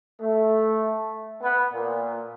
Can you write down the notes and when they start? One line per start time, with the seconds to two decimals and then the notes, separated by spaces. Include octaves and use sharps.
0.20 A3
1.42 B3
1.73 A#2